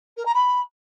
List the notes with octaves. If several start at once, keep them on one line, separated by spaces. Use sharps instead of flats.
A#4
A#5
B5